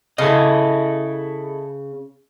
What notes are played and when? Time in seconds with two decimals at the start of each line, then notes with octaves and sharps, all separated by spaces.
0.18 C#3 E4 A4 D#5